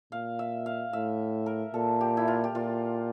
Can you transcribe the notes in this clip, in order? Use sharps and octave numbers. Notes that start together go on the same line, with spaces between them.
A#2 F5
E5
F5
A2 E5
A#4
A#2 A4
G4
E4
F4
G4
A#2 F4